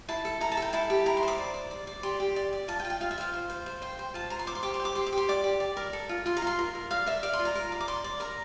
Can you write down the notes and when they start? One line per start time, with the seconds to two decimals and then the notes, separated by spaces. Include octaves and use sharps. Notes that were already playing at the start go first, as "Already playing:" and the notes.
0.08 E4 A5
0.25 A4
0.41 E4 A#5
0.52 A5
0.57 A4
0.62 G5
0.73 E4 A5
0.90 G4
1.06 E4 A#5
1.17 C6
1.23 C5
1.28 D6
1.39 D5
1.54 D5
1.71 D5
1.87 D5
2.03 G4 C6
2.20 G4
2.36 D5
2.53 D5
2.68 F4 A5
2.80 G5
2.85 F4
2.90 G5
3.01 F4 F5
3.11 E5
3.18 C5 F5
3.34 C5
3.50 C5
3.66 C5
3.82 C5 G5
3.99 C5
4.14 F4 A5
4.30 C5 A#5
4.39 C6
4.47 C5 D6
4.55 C6
4.63 G4 D6
4.74 C6
4.80 C5
4.85 D6
4.95 G4 C6
5.07 D6
5.13 G4 C6
5.29 D5 D6
5.44 G4
5.60 D5
5.77 A#4
5.93 A4
6.09 F4
6.26 F4 C6
6.37 A#5
6.42 F4 C6
6.59 A#4
6.75 A#4
6.91 D5 F5
7.06 A#4 E5
7.23 D5 F5
7.33 C6
7.39 F4
7.45 A#5
7.55 A#4
7.72 D5
7.80 D6
7.88 D5 C6
8.04 D5
8.20 A#4 A#5